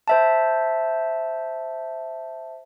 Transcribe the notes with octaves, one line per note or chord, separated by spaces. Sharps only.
C5 E5 A5